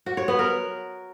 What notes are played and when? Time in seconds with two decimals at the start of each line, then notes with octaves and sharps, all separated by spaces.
0.06 F#4
0.17 C#5
0.28 B3
0.39 A#4